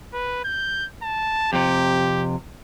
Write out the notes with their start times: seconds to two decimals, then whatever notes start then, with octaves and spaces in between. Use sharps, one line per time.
0.14 B4
0.45 G6
1.03 A5
1.53 F2 C3 G4